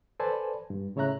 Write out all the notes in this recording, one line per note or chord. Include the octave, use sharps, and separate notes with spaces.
A4 B4 C5 D5 G#5 A5
G2
A2 C#3 C#5 E5 A#5 F#6